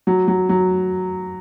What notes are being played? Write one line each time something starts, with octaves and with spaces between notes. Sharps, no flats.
F#3
F#3
F#3